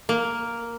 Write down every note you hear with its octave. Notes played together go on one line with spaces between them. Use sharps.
A#3